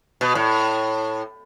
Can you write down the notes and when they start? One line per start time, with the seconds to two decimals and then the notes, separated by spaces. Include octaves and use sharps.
0.21 B2
0.35 A2